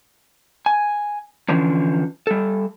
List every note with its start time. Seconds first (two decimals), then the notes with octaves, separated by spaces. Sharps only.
0.66 G#5
1.49 D3 E3 F3 C#4
2.27 G3 A4